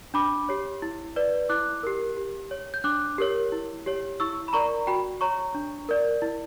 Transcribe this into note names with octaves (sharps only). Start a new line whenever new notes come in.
D4 B5 D6
G4 C#5
E4
B4 D5
E4 D6 F#6
G4 A#4
G4
C#5
G6
D4 D6 F#6
G4 A#4 C#5
E4
G4 C#5
E4 C#6 E6
B5
A#4 D5 A#5 C#6
F#4 G5 B5
C#5 A#5 C#6
D4
A#4 D5
E4